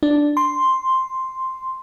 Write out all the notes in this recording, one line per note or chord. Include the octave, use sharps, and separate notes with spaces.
D4
C6